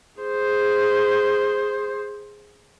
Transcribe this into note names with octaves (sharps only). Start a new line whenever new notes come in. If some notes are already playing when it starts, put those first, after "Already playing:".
G#4 C5